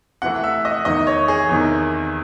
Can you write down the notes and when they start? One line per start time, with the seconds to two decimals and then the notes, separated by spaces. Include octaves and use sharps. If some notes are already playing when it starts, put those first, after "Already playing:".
0.22 C3 E3 A3 F#5
0.44 E5
0.65 D#5
0.85 E2 C3 D#3 D#5
1.07 C#5
1.28 G#4
1.49 E2 C3 D#3